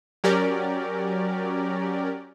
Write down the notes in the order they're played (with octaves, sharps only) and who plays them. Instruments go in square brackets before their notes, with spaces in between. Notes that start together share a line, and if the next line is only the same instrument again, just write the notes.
[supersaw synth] F#3 C#4 G4 A#4 D5